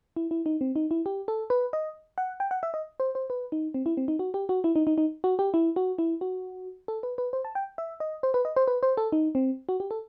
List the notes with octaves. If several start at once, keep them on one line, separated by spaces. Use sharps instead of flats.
E4
E4
D#4
C4
D#4
E4
G4
A4
B4
D#5
F#5
G5
F#5
E5
D#5
C5
C5
B4
D#4
C4
E4
C4
D#4
F#4
G4
F#4
E4
D#4
D#4
D#4
F#4
G4
E4
F#4
E4
F#4
A4
B4
B4
C5
A5
G5
E5
D#5
C5
B4
D#5
C5
B4
C5
A4
D#4
C4
F#4
G4
A4